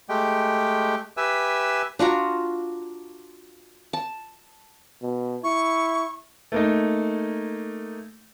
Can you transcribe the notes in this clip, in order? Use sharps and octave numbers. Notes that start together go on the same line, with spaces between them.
G#3 A3 G4 G5
G4 B4 E5 G#5 E6
D4 F4 F#4 A#5
A5
B2
E4 C#6
A3 A#3 D#4